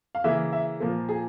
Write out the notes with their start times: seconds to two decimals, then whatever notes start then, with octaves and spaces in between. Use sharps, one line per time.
0.15 F5
0.24 C#3 E3 A#3 E5
0.53 E5
0.80 A#2 F3 A#3
1.09 G#4